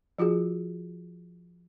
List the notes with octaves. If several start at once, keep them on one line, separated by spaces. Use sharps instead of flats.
F3 F4 F#4 G#4